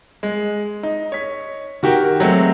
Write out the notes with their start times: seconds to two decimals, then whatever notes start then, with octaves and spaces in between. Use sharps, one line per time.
0.23 G#3
0.83 D#4
1.12 C#5 B6
1.83 D#3 F#4 G4 A#4
2.20 F#3 G#3 A3 C4